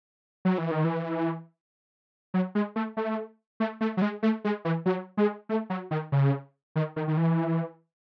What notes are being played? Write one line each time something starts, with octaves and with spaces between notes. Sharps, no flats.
F#3
E3
D#3
E3
F#3
G#3
A3
A3
A3
A3
F#3
G#3
A3
G#3
E3
F#3
G#3
A3
F#3
D#3
C#3
D#3
D#3
D#3
E3